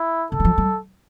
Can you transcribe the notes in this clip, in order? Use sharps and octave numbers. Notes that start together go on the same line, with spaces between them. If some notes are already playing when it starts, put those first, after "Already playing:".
Already playing: E4
D3 A4
G3
F3
G3